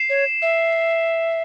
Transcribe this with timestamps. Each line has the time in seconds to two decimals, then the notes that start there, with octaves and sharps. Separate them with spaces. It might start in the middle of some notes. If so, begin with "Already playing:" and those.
Already playing: C7 E7
0.10 C#5
0.42 E5